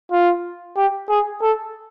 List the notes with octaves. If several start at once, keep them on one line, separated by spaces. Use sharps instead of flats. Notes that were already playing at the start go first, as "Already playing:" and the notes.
F4
G4
G#4
A4